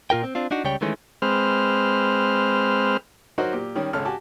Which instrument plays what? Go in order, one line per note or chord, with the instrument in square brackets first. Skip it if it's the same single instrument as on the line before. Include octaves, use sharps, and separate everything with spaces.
[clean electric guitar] A#2 F4 A#4 G5
C4
C4 D4 F4
D4 D#4 F#4
C#2 C#3 G3 C#5 G5
D#3 E3 G#3 A3 C#4
[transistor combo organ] G#3 C4 B4 C5 F6
[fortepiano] F#3 D#4 F#4 A#4 C5 D#5
A#2 G4
D#3 G3 C#4
G#1 C#2 C#4 A4 F6
F#4 G4 G#5 A5